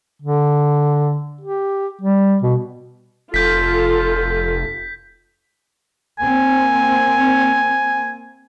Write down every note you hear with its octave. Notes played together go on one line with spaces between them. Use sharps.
D3
G4
G3
B2
F1 F4 A4 G6 B6
A#3 C4 G#5